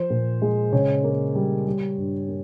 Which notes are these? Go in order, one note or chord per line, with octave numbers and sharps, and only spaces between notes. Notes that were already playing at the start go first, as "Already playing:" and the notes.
Already playing: F3 C5
A#2
G#3
C#3 C#5
A#3
G3
G3
G2
A#3